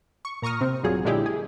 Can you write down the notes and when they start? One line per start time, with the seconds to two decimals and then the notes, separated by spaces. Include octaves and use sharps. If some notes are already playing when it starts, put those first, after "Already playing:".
0.25 C#6
0.42 A#2 A#5 C#6 D#6 F6
0.61 C3 C4
0.83 A#1 G2 F3 F#3 G#4
1.05 A#2 D3 G#3 E4 G4 G#4
1.26 G#4